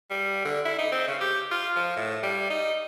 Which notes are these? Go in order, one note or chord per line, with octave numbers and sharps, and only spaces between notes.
G3
D3
E4
D#4
C4
C#3
G4
F4
F3
A2
G3
D#4